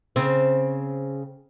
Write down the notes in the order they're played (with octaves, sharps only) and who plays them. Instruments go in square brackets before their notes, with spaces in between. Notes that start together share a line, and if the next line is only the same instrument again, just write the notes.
[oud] C#3 C4